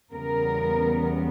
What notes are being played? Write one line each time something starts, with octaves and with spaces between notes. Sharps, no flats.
E2 C#3 G3 B3 A#4